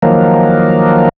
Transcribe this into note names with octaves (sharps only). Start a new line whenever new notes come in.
D#3 F3 F#3 A#3